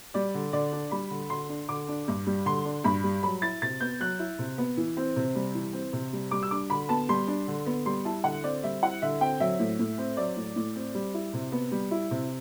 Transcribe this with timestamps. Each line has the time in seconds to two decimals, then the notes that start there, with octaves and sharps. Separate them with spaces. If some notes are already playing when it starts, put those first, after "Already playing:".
0.14 G3 D5
0.34 D3
0.53 D3 D5
0.73 D4
0.91 G3 B5
1.11 D3
1.30 D3 C6
1.49 D4
1.69 D3 D6
1.88 D4
2.08 G2
2.27 G3
2.45 D3 C6
2.65 D4
2.84 G2 B5
3.04 G3
3.23 F#3 B5
3.42 E4 A6
3.62 C3 A6
3.81 B3 G6
4.00 F#3 F#6
4.19 E4
4.39 C3
4.58 B3
4.77 E3
4.97 C4
5.16 C3
5.35 G3
5.55 E3
5.73 C4
5.93 C3
6.13 G3
6.31 G3 D6
6.43 E6
6.51 D4 D6
6.70 D3 B5
6.89 B3 A5
7.09 G3 C6
7.28 D4
7.48 D3
7.66 B3
7.86 G3 C6
8.05 E4 A5
8.24 D3 F#5
8.44 C4 D5
8.63 G3 E5
8.82 E4 F#5
9.02 D3 E5
9.21 C4 G5
9.40 F#3 E5
9.59 A2
9.79 A2
9.98 C4
10.17 F#3 D5
10.36 A2
10.56 A2
10.76 C4
10.95 G3
11.14 E4
11.33 C3
11.52 B3
11.71 G3
11.91 E4
12.11 C3